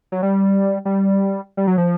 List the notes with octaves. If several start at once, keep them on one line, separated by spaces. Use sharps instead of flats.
F#3
G3
G3
G3
F#3
F3